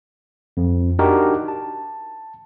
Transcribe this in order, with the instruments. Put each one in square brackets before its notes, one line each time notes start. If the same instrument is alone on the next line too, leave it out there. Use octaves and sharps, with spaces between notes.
[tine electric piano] F2
D4 D#4 F#4 G4 A#4
A5